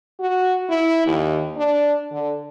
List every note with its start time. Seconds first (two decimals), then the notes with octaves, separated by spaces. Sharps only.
0.20 F#4
0.70 E4
1.07 D#2
1.57 D4
2.12 D3